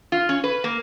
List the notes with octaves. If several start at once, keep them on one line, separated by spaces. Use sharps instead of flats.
F4
C#4
B4
A#3